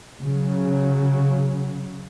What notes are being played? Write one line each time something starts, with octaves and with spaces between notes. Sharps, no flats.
C#3 F#3